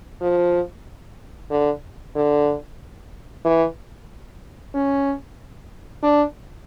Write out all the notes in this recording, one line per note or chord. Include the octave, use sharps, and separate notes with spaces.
F3
D3
D3
E3
C#4
D4